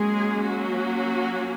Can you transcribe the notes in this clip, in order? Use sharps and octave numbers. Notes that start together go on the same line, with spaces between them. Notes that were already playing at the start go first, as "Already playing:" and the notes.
Already playing: F#3 G#3 A#3 C#4 G#4
F#3 F#4